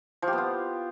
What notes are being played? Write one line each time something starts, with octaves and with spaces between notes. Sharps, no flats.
F3
G4
B3
F4